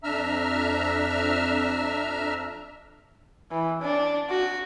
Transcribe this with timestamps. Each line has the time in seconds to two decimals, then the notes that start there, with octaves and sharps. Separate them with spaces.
0.04 F2 D4 E5 A#5 E6 F6
3.51 E3
3.82 D4
4.30 F#4